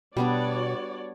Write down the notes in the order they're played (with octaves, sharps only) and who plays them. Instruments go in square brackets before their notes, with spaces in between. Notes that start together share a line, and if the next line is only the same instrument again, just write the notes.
[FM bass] B2 [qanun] G3 B3 D4 [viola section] F#4 C#5 D5